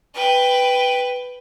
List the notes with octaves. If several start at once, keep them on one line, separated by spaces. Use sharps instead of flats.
B4 G5